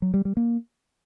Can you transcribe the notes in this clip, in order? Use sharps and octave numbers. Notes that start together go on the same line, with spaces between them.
F#3
G3
G3
A#3